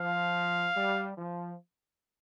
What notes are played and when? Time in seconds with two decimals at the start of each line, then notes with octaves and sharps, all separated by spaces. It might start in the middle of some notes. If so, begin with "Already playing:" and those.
Already playing: F3 F5
0.76 G3
1.17 F3